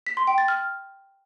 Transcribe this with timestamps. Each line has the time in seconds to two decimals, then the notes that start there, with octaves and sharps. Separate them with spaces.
0.07 B6
0.17 C6
0.27 G5
0.38 A6
0.48 F6